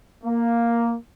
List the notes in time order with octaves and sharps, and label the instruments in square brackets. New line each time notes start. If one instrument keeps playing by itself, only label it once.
[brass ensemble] A#3